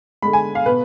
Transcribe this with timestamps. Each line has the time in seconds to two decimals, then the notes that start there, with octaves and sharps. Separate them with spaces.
0.22 D3 G#3 B5
0.33 G#5
0.55 F5
0.66 B2 B4